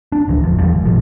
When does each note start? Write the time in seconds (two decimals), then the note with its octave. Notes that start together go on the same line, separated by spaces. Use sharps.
0.12 D4
0.27 D1 C#2 D#3 E3
0.42 G#1 E2 F3
0.59 D#3 F3 G3
0.74 G1 G#2
0.85 A#1 G#2 B2 F3